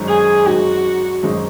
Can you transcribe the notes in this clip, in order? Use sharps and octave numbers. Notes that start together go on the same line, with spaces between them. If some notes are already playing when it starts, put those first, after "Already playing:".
Already playing: G#1 F#2 D#3 G#3 D#4
G#4
G#1 F#2 D#3 G#3 D#4 F#4
G#1 F#2 D#3 G#3 D#4